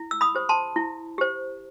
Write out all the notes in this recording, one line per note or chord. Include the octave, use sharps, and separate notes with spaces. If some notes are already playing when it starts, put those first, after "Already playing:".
Already playing: E4
E6
B5 D#6
G4 C5
A5 C6
E4
G4 C5